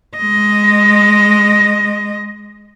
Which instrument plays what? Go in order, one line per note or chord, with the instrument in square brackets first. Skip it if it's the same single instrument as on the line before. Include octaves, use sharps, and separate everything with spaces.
[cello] G#3 D#5